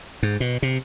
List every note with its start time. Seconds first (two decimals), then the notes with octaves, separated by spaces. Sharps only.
0.23 G#2
0.40 B2
0.62 C3